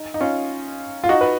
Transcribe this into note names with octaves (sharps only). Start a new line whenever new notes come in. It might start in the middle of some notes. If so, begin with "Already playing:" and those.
Already playing: D#4
D#4
C#4 F4
F4
D#4 F#4
B4